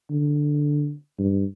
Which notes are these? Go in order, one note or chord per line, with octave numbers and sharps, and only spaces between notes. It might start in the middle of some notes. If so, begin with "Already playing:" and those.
D3
G2